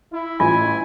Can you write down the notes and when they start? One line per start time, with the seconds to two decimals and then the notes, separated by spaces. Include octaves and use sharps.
0.12 E4
0.40 A1 F4 G#5